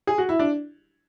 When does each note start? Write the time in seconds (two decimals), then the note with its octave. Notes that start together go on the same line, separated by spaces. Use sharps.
0.07 G#4
0.18 F#4
0.29 E4
0.39 D4